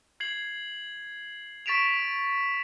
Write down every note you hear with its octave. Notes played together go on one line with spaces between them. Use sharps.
G#6 C7 F#7
C#6 A6 B6 D7 E7 F7